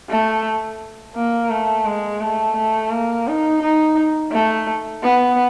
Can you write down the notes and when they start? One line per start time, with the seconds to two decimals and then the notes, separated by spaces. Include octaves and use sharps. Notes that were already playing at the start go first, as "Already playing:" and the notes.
0.09 A3
1.16 A#3
1.50 A3
1.85 G#3
2.20 A3
2.56 A3
2.91 A#3
3.27 D#4
3.62 D#4
4.32 A3
5.03 B3